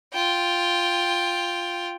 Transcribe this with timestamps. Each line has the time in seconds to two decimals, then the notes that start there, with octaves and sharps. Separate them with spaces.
0.13 F4 G5